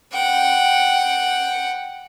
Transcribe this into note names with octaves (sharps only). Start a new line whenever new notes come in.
F#5 G5